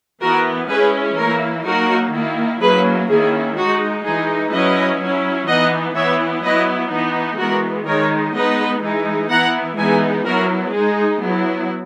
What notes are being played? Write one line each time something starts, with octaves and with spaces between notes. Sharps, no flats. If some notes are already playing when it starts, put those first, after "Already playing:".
E3 B3 E4 F#4 A#4
G#3 C#4 E4 G#4 B4
E3 A#3 E4 A#4 C#5
F#3 A#3 D#4 F#4 A#4
D#3 A#3 E4
F#3 A#3 C#4 E4 G#4 B4
D#3 A#3 C#4 E4 G#4
G#3 D#4 F#4
E3 G#3 D#4 G#4
F#3 C#4 E4 B4 D#5
F#3 C#4 E4
E3 B3 D#4 D#5 F#5
E3 B3 E4 C#5 E5
F#3 B3 E4 B4 D#5
E3 B3 D#4
E3 G#3 B3 F#4 A#4
D#3 G#3 D#4 A#4 C#5
G#3 B3 D#4 B4 D#5
E3 G#3 D#4
E3 B3 E4 F#5 A#5
E3 G#3 B3 D#4 E5 G#5
F#3 B3 E4 F#4 A#4
G#3 D#4 G#4
F#3 B3 E4